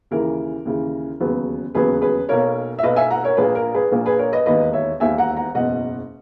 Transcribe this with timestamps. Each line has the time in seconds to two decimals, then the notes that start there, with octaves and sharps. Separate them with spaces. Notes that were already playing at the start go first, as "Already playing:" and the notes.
0.11 D#2 C#3 E3 A#4
0.65 D#2 C#3 E3
1.20 E1 D#2 C#3 F#3 B3
1.75 E1 D#2 C#3 F#3 B3 G#4 B4
2.01 G#4 B4
2.29 B1 B2 A#3 A#4 C#5
2.79 E5
2.83 B1 B2 A#3 B4 D#5
2.96 E5 G#5
3.11 F#5 A#5
3.24 A#4 C#5
3.37 A#1 A#2 A#3 G#4 B4
3.55 A#4
3.74 G#4 B4
3.92 A#1 A#2 A#3
4.06 G#4 B4
4.19 A#4 C#5
4.32 B4 D#5
4.46 E1 D#2 D#3 A#3 B4 D#5
4.73 C#5 E5
5.00 E1 D#2 D#3 A#3 E5 G#5
5.18 F#5 A#5
5.36 F#5 A#5
5.54 F#1 E2 B2 D#5 F#5